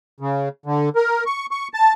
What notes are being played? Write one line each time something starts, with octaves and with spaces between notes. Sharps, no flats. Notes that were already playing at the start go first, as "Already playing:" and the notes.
C#3
D3
A#4
C#6
C#6
A5